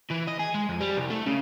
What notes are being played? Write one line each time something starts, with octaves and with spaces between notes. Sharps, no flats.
E3
D#5
G#4
G#3
F2
G3
C2
A3
C#3